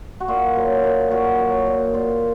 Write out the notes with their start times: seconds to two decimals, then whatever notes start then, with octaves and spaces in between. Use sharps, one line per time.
0.20 F#4
0.28 A#2 F4
0.56 F#3
0.84 A#2
1.11 A#2 F#4
1.39 F#3
1.67 A#2
1.94 A#2 F4